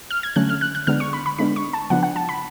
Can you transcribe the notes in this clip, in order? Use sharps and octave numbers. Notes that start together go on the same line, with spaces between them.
F6
G#6
D3 F#3 A3 C#4 F#6
F6
F#6
F#6
D3 G#3 B3 D4 F6
C#6
B5
B5
D3 G#3 B3 D4 B5
C#6
A5
C#3 F3 B3 D4 F#5
F#5
A5
B5